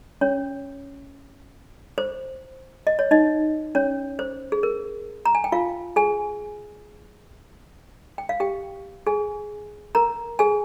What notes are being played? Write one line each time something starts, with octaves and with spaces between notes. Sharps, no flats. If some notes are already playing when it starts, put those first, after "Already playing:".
C#4 C#5
C5
D#5
C#5
D#4 D#5
C#4 C#5
C5
G#4
A#4
A#5
G#5
G5
F4 F5
G#4 G#5
G5
F5
G4 G5
G#4 G#5
A#4 A#5
G#4 G#5